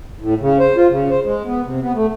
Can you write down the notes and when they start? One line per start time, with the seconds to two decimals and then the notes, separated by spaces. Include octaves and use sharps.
0.21 A2
0.41 C#3
0.59 C5
0.77 F4
0.90 C#3
1.10 C5
1.25 G#3
1.45 B3
1.65 C3
1.83 B3
1.94 A3